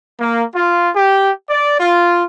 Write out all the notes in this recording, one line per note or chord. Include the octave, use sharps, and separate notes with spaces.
A#3
F4
G4
D5
F4